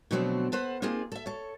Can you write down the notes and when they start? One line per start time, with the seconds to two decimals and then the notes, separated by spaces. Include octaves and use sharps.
0.11 B2 D3 F3 F#3 A3 C4
0.52 A4 B4 C5 F#5
0.82 A#3 C4 D#4 F4 G#4
1.12 A4 E5
1.26 A4 C#5